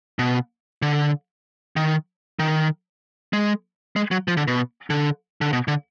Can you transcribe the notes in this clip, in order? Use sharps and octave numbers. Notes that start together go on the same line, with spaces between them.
B2
D3
D#3
D#3
G#3
G#3
F#3
F3
D3
B2
D3
D3
B2
D3